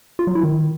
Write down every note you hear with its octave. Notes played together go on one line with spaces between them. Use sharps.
F4
F#3
E4
D#3